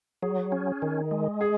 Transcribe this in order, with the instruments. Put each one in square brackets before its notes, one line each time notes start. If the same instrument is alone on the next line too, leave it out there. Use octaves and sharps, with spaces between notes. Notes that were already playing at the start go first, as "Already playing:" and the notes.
[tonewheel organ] F#3 [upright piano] G#4
[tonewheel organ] C#4
D#3
G#3
[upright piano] G#4